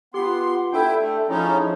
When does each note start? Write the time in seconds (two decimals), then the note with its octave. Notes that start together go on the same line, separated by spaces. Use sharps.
0.14 B3 F4 G4 C6
0.73 D4 E4 A4 G5
0.99 A3
1.29 F3 C#4 D#4 E4 G#4